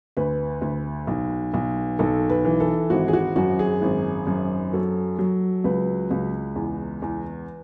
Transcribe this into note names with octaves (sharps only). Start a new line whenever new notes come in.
D2 B4
D2
B1
B1
B1 A4
B4
E3
A4
G#1 F#4
G#4
F#4
F#2 F#4
G#4
G#1
F#2
F#3 A4
F#3
C#2 B4
C#2
E2
E2